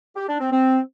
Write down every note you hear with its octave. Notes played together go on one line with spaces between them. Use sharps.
G4
D4
C4
C4